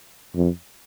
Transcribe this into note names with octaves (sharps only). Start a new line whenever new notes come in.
F2